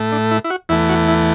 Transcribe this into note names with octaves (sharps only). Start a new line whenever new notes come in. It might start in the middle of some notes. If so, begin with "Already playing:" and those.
Already playing: A2 A3
D4
E4
E4
F#4
E2 E3 A3 E4
F#4
E4